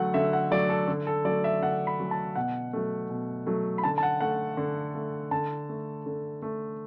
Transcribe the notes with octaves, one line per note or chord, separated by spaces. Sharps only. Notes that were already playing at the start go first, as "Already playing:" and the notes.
Already playing: D3 F#3 A3 F#5
D3 E5
F#5
F#3 A3 D5
A4
D3
A4
F#3 A3 D5
E5
D3 F#5
B5
F#3 A3
A5
B2 F#5
F#3 A3
B2
F#3 A3
B5
D3 A5
A5
F#5
A3 F#5
D3
A3
D3 A5
A3
D3
A3